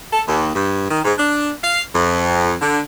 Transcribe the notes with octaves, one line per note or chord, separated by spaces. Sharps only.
A4
D#2
G2
D#3
G#2
D4
F5
F2
D3